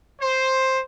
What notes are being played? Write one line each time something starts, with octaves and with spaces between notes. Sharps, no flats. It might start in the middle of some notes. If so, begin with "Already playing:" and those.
C5